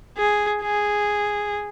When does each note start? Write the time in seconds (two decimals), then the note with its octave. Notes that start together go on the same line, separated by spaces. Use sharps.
0.17 G#4
0.62 G#4